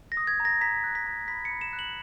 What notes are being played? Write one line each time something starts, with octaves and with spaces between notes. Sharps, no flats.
A#6
D#6
G#6
A#5
A#6
A#5 B6
F#6
B6
A#5
B5 B6
C#7
B5
E7
F#6
F#7